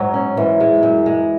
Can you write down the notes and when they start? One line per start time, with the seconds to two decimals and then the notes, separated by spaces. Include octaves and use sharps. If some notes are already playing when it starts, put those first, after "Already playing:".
Already playing: G#2 F#3
0.14 C#4
0.37 G#2 E3
0.60 G#3
0.83 F#2
1.06 G#3